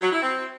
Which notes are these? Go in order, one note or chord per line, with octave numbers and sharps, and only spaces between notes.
F#3
E4
C4